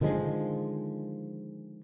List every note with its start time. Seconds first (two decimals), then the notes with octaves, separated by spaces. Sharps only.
0.01 D3 D#3 F3 G#3